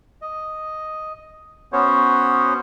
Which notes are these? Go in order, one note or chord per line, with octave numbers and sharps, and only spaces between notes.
D#5
B3 C#4 F#4 C5 C#5